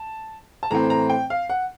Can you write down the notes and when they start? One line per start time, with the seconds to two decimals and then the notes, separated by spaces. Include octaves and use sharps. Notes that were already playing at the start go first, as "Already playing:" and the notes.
Already playing: A5
0.63 A5
0.71 A2 E3 A3 C4 A#5
0.90 A#5
1.10 G5
1.30 F5
1.50 F#5